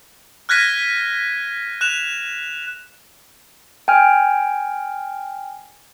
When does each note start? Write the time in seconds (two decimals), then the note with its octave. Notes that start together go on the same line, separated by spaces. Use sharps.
0.49 F6 F#6 G#6 A#6 B6 D#7
1.81 F#6 E7 F7
3.88 G5 G#5 F6